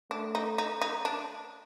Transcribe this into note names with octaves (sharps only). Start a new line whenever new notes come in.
A3 D4
D#4
D#4
D#4
D4